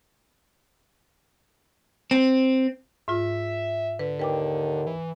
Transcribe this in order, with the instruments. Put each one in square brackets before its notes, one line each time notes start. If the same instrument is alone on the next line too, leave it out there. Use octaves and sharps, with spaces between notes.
[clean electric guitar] C4
[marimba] G#2 F4 [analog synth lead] E5
[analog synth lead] D3 [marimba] B4
[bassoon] D#2 [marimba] B4 G5 D6
[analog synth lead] E3